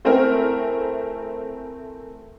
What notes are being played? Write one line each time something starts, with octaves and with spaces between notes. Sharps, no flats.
A3 C4 E4 G#4 A#4